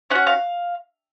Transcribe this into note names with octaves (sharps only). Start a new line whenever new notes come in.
C#4 F#4 F#5
F5